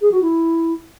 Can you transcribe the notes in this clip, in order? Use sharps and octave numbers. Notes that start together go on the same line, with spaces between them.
G#4
F#4
E4